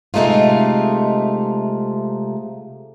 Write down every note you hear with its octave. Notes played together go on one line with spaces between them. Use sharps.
C3 G#3 A3 D#4 F4